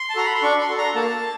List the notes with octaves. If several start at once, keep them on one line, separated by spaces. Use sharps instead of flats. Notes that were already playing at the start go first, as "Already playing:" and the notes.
Already playing: C6
A5
F#4 A4 A#5
B5
C6
D4 C#6
C6
F#4 A4
A#5
A#3 A5